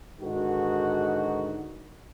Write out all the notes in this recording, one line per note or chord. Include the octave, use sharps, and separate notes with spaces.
G#2 D3 D#3 D#4 F#4